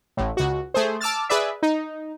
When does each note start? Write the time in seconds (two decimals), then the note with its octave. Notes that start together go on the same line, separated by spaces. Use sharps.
0.17 A1 A2
0.37 C#2 F#4
0.74 A3 G#4 C5
1.01 A5 D6 E6 F6 A6
1.29 G#4 B4 D5 E5
1.63 D#4